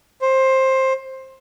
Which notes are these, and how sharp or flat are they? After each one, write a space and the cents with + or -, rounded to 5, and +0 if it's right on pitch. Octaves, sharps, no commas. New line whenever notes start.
C5 +15